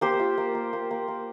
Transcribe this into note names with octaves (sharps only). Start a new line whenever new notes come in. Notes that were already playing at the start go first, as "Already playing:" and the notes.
A#3 G4 C5
F4
A#3
A#3
A#3
A#3
A#3